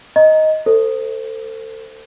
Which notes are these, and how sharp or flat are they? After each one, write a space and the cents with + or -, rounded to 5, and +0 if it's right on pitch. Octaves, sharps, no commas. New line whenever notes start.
D#5 +5 A#5 +5
A4 +30 C5 -15